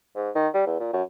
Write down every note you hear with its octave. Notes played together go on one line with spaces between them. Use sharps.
G#2
D#3
G3
E2
A#2
F#2